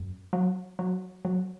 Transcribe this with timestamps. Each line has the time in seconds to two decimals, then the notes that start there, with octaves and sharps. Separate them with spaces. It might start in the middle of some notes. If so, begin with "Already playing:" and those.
Already playing: F#2
0.33 F#3
0.79 F#3
1.25 F#3